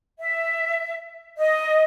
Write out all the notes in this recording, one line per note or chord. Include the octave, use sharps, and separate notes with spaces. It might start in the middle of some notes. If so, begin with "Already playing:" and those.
E5
D#5